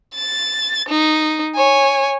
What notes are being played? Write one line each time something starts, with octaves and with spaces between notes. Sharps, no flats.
A6
D#4
C#5 G#5